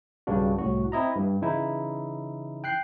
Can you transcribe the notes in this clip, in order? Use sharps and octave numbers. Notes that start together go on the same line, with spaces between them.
B1 G2 C#3 D4 F#4
C2 A2 F#4
C4 E4 D#5 A#5
G2
C#3 E3 D#4 E4
G5 F#6 C7